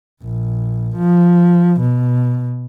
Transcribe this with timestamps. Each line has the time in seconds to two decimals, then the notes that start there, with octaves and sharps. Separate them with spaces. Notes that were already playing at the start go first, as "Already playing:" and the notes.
0.22 A#1
0.96 F3
1.81 B2